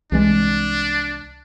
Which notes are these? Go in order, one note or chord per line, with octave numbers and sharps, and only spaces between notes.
C2 E3 G#3 D4